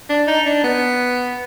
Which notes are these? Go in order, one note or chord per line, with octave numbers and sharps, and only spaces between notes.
D4
D#4
D4
B3